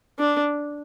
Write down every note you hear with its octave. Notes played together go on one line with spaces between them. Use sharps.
D4